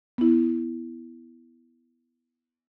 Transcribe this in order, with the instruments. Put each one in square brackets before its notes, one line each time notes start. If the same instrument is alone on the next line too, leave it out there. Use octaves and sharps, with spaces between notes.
[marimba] B3 E4